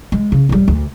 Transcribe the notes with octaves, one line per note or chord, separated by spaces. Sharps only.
G#3
C#3
D1 G3
D2